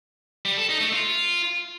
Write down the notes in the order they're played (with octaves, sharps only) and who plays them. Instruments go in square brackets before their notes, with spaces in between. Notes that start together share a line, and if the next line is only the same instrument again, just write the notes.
[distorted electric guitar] G3
A4
D#4
A3
F4